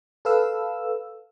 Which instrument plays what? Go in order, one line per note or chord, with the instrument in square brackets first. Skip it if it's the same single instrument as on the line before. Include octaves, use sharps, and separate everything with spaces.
[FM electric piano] A4 B4 F5 E6